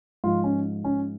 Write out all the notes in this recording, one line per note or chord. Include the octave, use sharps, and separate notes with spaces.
G#2 F3 F4
C#4
C#4